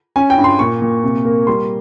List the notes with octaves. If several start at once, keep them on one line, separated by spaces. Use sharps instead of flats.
C#4 G#5
G5
G2
C6
A#2 C#6
A#2
C3
A#3
G3 C6